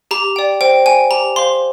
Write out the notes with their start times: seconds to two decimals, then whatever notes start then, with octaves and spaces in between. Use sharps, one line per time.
0.11 G4 A#5
0.36 D5 G5
0.61 C5 G5
0.86 G5 G#5
1.11 G4 A#5
1.36 C5 F5 C6